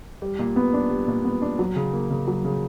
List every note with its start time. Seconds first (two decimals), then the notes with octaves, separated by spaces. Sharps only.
0.22 G3
0.39 A#2
0.56 B3
0.73 D4
0.90 G3
1.08 A#2
1.25 B3
1.42 D4
1.59 F#3
1.76 C#3
1.93 A#3
2.10 C#3
2.28 F#3
2.45 C#3